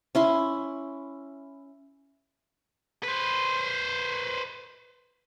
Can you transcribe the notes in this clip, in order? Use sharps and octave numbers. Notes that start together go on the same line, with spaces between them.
C#4 E4 C6
B4 C5